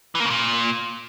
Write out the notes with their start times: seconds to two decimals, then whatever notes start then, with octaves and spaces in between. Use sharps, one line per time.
0.15 E3
0.20 A#3
0.25 C#3
0.30 A#2